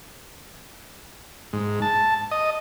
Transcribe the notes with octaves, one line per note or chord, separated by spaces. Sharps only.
G#2
A5
D#5